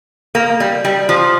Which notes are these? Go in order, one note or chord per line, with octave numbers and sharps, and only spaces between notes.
A#3
G3
G3
F3